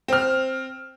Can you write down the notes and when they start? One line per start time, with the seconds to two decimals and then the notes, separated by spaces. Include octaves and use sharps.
0.08 C4 F6